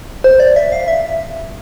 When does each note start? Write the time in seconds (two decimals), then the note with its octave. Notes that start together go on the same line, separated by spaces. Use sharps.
0.24 C5
0.40 D5
0.56 E5
0.72 F5
0.88 E5